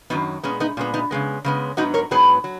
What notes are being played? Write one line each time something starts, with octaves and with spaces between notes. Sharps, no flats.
F#2 D#3 F#3 B3 D#4
A#2 G#3 B3 C#4
B3 D#4
A#2 G#3 B3 C#4
B3 D#4
C#3 G#3 B3
C#3 G#3 B3
G#2 F#3 B3 D#4 F#4
A#4 C#5
G#2 F#3 B3 G#4 B4
F#3